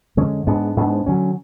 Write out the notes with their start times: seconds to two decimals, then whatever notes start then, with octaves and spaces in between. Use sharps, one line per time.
0.17 F2 D3 G#3 C#4
0.47 G#2 G#3 B3 D4
0.76 G#2 G#3 B3 D4
1.06 D3 F#3 C#4